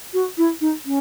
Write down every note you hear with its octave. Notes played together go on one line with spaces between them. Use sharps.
F#4
E4
D#4
C#4